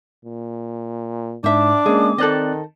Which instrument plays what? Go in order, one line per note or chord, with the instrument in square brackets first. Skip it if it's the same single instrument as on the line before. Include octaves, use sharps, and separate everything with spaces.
[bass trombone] A#2
[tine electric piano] G#2 [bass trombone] D4 [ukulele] C5 E5 [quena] D6
[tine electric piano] G#3 A#3 C#4 [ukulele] G#4
[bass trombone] D#3 [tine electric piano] C4 D5 F#6 [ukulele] A4 C5 D#5